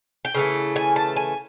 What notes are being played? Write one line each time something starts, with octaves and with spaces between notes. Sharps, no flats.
G5
C#3 E3 A3
G#5
A5
G#5